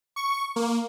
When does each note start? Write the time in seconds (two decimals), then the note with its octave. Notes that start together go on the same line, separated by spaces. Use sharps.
0.16 C#6
0.56 A#3